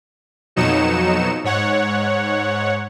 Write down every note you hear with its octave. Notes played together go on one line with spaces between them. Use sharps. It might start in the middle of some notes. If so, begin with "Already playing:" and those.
F2 B2 F#3 D#4 C#7 E7
G#2 C#5 F#5